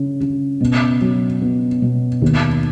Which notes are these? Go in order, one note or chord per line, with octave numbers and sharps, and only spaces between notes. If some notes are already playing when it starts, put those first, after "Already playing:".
Already playing: C#3
C#3
B2
F#3
B3
B2
D#2